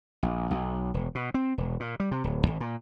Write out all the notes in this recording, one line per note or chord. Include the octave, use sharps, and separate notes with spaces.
A#1
B1
E1
B2
C4
E1
A#2
G3
C3
D1
G#1
A#2